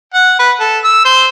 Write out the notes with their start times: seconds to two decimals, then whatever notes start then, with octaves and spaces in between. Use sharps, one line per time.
0.14 F#5
0.39 B4
0.60 A4
0.84 E6
1.05 C5